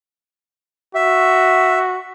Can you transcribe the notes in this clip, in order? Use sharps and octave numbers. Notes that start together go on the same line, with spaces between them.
F#4 E5